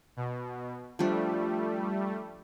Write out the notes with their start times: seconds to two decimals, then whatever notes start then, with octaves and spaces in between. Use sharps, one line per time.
0.17 B2
0.99 F3 G3 A3 D4